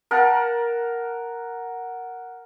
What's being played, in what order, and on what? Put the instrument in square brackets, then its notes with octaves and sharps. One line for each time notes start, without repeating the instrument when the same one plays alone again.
[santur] A#4 F5 F#5 A5